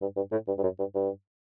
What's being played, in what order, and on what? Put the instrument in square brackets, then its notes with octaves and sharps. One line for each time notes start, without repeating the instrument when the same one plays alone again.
[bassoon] G2
G2
A2
G2
G2
F#2
G2
G2